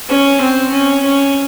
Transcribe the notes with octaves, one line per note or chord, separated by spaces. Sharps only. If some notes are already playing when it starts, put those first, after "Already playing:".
C#4
C4
C#4
C#4